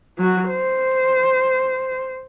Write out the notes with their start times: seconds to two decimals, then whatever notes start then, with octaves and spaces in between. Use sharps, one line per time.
0.18 F#3 F#4
0.49 C5